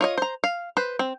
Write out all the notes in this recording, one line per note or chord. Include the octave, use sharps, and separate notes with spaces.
F4 C#5 D#5
C5 A#5
F5
B4 C5
C4